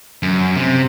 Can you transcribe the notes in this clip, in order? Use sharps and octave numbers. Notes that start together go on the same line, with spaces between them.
F#2
C3